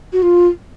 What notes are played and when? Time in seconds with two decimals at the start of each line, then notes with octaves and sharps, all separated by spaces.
0.13 F#4
0.22 F4